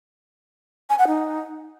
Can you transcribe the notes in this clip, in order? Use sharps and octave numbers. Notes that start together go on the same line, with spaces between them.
G#5
F#5
D#4